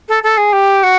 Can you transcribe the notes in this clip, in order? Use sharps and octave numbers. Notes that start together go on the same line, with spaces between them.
A4
A4
G#4
G4
F#4